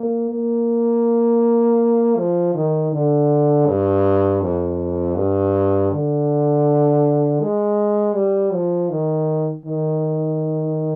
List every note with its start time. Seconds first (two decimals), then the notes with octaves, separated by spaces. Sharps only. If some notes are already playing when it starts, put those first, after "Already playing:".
Already playing: A#3
0.30 A#3
2.17 F3
2.54 D#3
2.92 D3
3.67 G2
4.41 F2
5.15 G2
5.91 D3
7.40 G#3
8.14 G3
8.53 F3
8.89 D#3
9.65 D#3